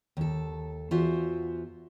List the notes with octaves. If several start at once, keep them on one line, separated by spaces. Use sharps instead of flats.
D#2 A4
E2 F4 F#4 C5 E5